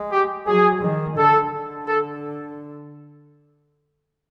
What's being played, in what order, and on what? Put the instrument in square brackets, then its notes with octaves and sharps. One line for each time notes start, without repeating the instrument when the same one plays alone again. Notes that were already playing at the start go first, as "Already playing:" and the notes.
Already playing: [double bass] G#3
[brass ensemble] G4
[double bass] F#3 [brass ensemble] G#4
[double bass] D#3
[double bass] D3 [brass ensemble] A4
[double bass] D3
[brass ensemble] A4